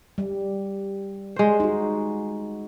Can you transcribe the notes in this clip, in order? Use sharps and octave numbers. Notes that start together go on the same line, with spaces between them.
G3
G#3 C5
D#4 F#4